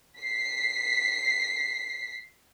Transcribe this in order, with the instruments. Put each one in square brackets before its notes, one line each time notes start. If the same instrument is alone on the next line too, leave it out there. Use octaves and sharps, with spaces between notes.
[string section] B6 C7